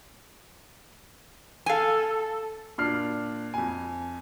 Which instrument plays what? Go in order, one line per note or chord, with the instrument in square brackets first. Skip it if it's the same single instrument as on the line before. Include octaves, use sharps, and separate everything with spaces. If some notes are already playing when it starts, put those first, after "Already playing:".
[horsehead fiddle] A4 [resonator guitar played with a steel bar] F5 G#5
[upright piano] A#2 D4 F6 C7
F2 G#5